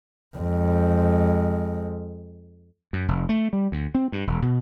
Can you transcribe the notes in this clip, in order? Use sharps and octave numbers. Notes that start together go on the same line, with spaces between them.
F2 G#3
F#2
F1
A3
G3
D2
C4
G2
E1
B2